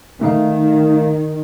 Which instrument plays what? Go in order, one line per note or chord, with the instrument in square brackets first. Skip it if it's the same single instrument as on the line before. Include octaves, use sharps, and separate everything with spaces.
[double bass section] D#3 [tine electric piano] A3 D#4 F5